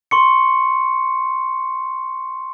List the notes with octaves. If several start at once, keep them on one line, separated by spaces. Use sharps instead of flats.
C6 C#6 C#7